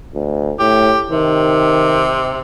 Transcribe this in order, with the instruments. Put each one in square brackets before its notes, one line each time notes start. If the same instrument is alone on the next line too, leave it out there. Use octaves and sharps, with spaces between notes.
[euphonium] D2
[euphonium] A2 [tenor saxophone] G4
[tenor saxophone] C3 [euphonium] D#3